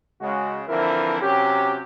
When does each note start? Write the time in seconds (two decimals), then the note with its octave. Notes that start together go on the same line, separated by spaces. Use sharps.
0.21 C#3 G#3 F#4
0.68 D3 E3 F3 C4 E4 A#4
1.22 C3 F#3 C#4 G4